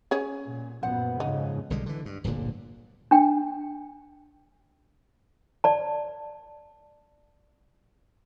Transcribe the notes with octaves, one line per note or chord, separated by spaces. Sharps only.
C#4 G#4 C#5
A#2
F#2 A#2 B3 C5 F#5
F2 G#2 C#3 D#4
B1 D3 G3 G#3
D3 E3
G2
D1 G1 A#2 D3
D4 G5
D5 A5